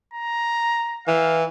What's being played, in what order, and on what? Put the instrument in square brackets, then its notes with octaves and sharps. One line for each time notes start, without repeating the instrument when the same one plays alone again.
[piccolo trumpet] A#5
[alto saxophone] E3 [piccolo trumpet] F5